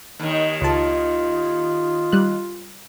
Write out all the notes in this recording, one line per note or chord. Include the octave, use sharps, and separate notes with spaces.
D#2 D#3
C#2 F4 A5
G3 F#6